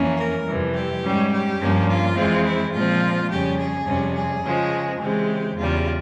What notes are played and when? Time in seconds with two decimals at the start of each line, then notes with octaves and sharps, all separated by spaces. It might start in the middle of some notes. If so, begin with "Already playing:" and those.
Already playing: F2 E3 A#3 C#4
0.16 A#4
0.45 F2 C3 E3 G3
0.74 G4
1.01 G#2 G3 C#4
1.31 G4
1.60 G2 F3 A#3 C#4
1.88 F4
2.15 F2 E3 G#3 C4
2.44 E4
2.72 A#2 F3 G#3 C4 F4
3.29 F2 C#3 G3 C#4 G4
3.59 G#4
3.86 F2 C3 G3 C#4
4.16 G#4
4.43 C#3 F3 G#3
5.00 C#3 E3 G#3 C4 G4
5.57 E2 C#3 G3 F4